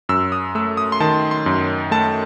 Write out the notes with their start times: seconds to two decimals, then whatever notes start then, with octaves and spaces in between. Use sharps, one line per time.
0.09 F#2 E6
0.32 D#6
0.55 A3 E6
0.77 D#6
0.92 C6
1.00 D#3 A5
1.31 C6
1.46 F#2
1.91 A3 A5